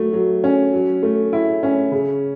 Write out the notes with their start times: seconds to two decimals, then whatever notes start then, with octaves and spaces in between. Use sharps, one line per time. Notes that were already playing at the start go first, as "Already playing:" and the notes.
Already playing: F#3 A3
0.13 F#3
0.44 C#4
0.74 F#3
1.03 A3
1.33 E4
1.63 C#4
1.92 C#3